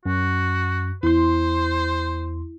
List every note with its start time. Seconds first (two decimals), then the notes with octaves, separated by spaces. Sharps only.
0.06 F#2 F#4
1.03 E2 E4 C5 C6